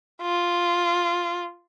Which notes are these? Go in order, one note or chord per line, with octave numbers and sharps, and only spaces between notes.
F4